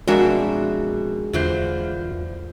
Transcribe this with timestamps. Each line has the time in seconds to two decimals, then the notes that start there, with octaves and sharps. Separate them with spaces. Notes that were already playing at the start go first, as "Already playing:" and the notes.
0.08 F2 B2 G#3 D4 F#4 G#4 A#4 E5
1.33 E2 D3 E3 F4 C5